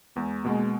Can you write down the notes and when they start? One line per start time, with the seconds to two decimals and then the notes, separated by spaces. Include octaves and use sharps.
0.16 E2 G#3 B3
0.44 B2 G#3 A#3 C#4